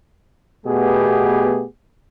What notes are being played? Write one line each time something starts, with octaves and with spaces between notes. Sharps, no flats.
B2 A3 B3 G4 G#4